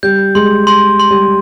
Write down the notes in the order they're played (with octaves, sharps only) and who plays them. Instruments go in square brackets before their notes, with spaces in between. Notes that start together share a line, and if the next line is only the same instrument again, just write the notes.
[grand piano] G3 [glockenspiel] G6
[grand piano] G#3 [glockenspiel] C6
[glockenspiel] C6
C6
[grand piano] G3